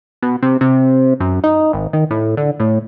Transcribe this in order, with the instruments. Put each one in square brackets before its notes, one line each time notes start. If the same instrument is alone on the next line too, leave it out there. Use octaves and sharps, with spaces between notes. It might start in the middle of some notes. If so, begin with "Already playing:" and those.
[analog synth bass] B2
C3
C3
F#2
D#4
G#1
D#3
A2
D3
A2